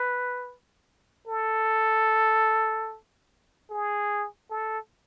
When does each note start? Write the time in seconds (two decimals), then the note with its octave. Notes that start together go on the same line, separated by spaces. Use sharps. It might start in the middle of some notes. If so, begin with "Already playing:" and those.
Already playing: B4
1.28 A4
3.70 G#4
4.51 A4